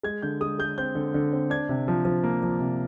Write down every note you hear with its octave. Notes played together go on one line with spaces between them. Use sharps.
G#3 G#6
D3 G6
G#3 D#6
G#3 G6
C4 G6
D3
D3
C4
D4 G#6
C3
F3
F3
A#3
F3
C3